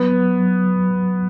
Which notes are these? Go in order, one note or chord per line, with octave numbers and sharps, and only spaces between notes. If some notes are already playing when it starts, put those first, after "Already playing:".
Already playing: F#3 B3
F#3
F#3
F#3
F#3